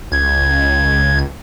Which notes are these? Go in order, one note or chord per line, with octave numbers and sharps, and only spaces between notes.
C#2 G#6